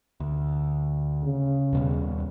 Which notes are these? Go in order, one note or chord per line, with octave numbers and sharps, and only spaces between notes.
D2
C#3
D#2 B2 G3